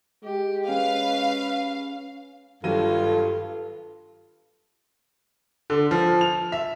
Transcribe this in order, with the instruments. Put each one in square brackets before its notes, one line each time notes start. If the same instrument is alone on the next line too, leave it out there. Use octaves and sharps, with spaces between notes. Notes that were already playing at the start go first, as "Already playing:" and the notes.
[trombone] G#3 [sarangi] G4
[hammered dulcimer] C#4 [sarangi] B4 [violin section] F5
[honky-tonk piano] G#1 F#3 D#7 [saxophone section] G2 [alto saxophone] F4 [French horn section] A4
[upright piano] D3
F3
F7
E5